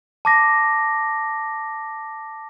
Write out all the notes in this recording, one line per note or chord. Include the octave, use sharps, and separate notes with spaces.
A5 D6 A#6